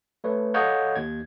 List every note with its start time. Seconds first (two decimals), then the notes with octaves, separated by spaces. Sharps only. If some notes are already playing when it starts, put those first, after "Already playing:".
0.24 A3 B4 C#5
0.54 A4 C#5 D#5 F5 F#5 G6
0.96 D#2 G#6